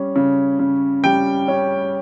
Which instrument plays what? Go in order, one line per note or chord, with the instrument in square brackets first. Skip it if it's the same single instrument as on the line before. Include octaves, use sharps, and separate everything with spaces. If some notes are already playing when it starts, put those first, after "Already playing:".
Already playing: [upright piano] G3 C#4
C#3
C#3
G3 G5
C#4